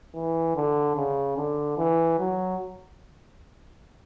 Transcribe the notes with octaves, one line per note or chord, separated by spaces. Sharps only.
E3
D3
C#3
D3
E3
F#3